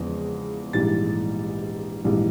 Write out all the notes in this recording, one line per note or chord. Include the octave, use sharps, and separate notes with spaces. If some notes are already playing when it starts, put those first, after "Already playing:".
Already playing: E2 C#3 F3 G#3
A#1 G#2 E3 G3 A6
A#1 G#2 E3 G3